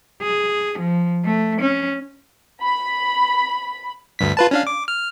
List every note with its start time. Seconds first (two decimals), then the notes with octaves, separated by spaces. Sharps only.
0.22 G#4
0.79 F3
1.24 A3
1.61 C#4
2.63 B5
4.19 D2 G2 B6
4.37 F4 B4 A5
4.51 C#4 D4 F5
4.67 D6
4.88 F6